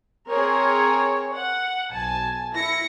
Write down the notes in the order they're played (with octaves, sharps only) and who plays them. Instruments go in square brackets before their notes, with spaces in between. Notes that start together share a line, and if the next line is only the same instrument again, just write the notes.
[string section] C4 G#4 A#4 C#5
F#5
B1 G#5 A5
E4 A#6 C#7